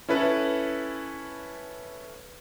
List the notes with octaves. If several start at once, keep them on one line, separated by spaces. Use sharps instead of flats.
C#4 E4 A4 B4